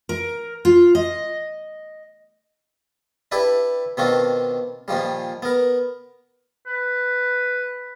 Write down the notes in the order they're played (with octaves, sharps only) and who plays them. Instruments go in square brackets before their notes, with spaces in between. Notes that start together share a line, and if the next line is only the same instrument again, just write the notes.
[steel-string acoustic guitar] A#4
F4
D#5
[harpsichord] D4 E4 G4 B4 D5
B2 D#3 C4 D4 F4 F#4
A#2 D#3 F3 G3
B3 A#4
[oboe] B4